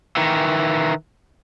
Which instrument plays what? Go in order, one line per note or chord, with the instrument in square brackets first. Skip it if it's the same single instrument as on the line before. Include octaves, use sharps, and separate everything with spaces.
[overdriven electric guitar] D#3 E3